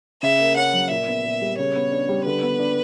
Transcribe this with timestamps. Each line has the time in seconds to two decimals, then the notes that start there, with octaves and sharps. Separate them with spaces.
0.23 C#3 E5
0.40 A#3
0.57 C#4 F#5
0.73 F#3
0.90 A#2 E5
1.07 B3
1.24 A#2
1.41 G3
1.58 C#3 C#5
1.76 B3
1.92 D4
2.09 G3
2.26 D3 B4
2.43 B3
2.60 D4